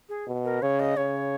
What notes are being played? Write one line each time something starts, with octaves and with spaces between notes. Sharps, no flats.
G#4
B2
A#4
C#3 C#5
D#5
C#3 C#5